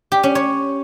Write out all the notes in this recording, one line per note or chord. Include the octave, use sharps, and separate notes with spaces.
G4
C#4
C#5